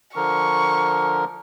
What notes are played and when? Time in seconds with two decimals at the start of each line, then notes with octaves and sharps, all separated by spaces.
0.16 D3 F3 A#4 C#6